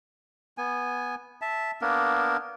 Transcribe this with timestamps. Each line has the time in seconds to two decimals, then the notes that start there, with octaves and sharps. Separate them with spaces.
0.58 B3 G#5
1.42 E5 A5
1.81 A#3 B3 D4 A#4